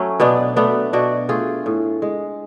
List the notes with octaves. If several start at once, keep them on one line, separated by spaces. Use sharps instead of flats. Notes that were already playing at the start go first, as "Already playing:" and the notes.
Already playing: F#3 A3 C#4
B2 B3 D4
A3 B3 D4
B2 D4 F#4
A3 F4 G#4
A2
G#3